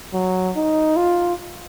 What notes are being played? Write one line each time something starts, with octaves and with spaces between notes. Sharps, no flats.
F#3
D#4
F4